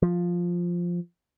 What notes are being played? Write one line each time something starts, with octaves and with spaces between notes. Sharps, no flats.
F3